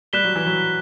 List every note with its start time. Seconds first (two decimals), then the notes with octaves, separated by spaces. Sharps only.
0.13 G3 F#6 B6 E7 G7
0.25 F#3
0.36 E3
0.47 F#3